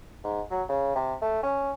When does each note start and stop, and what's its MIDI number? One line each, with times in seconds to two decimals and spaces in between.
0.24 0.41 44
0.51 0.63 54
0.69 0.95 49
0.95 1.15 48
1.22 1.40 57
1.43 1.71 61